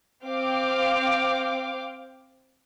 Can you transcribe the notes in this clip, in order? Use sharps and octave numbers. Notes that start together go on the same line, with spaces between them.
C4 F5 G5 D6